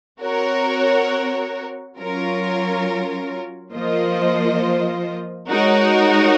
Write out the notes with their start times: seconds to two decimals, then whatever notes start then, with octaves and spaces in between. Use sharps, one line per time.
0.22 C4 F#4 A#4 C#5
1.97 F#3 C#4 F4 A#4 C#5
3.74 F3 A#3 F4 C5 D#5
5.48 G#3 D#4 F#4 A#4 C#5